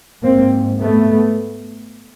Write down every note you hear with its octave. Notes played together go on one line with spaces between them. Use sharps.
G#2 A#3 C4
A3 B3